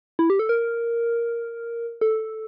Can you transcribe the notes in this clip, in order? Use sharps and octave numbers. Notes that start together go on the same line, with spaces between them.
E4
G4
A4
A#4
A4